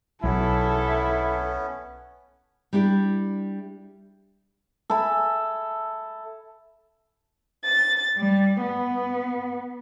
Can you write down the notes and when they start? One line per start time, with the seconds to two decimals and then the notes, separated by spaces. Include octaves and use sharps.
0.24 B1 F#3 B3 C#4 E4 A4 E5
2.73 G3 D4 E4 G4
4.90 A4 E5 G#5 B5
7.65 A6
8.16 G3
8.61 B3